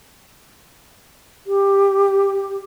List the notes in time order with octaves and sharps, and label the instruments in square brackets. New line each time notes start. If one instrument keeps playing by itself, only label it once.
[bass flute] G4